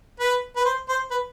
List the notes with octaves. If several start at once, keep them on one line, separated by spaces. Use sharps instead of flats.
B4
B4
C5
C5
B4